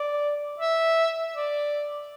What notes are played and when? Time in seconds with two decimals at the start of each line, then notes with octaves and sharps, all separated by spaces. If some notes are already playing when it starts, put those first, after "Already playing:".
Already playing: D5
0.60 E5
1.35 D5